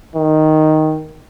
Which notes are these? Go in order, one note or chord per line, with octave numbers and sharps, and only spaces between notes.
D#3